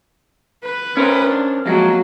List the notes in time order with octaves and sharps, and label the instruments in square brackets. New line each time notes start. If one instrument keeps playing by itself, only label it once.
[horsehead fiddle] B4
[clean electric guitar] C#4 A#4 C5
[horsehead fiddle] D4
[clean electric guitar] F2 G#3 [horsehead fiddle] F#3 A#3